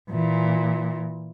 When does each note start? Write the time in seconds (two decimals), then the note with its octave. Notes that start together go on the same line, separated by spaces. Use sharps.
0.10 A#2 E3